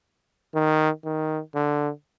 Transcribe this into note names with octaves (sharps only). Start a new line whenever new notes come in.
D#3
D#3
D3